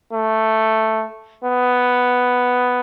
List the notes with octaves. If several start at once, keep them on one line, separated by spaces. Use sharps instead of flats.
A3
B3